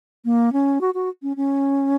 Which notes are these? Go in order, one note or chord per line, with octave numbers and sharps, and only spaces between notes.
A#3
C#4
F#4
F#4
C#4
C#4